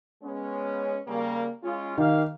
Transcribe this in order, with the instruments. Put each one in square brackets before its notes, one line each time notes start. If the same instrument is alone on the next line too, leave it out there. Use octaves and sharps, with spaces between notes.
[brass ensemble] G#3 B3 C#4
C#3 G3 A#3
G#3 C#4 F4
[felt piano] D#3 [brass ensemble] A#3 G4 F5